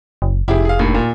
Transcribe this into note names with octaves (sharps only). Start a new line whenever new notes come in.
F#1
F1 E4 G4 G#4
G#4 F5
D#2 A2 D3
A#2